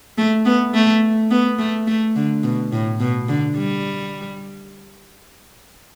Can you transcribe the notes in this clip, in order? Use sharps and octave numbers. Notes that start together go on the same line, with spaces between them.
A3
B3
A3
B3
A3
A3
D3
B2
A2
B2
D3
G3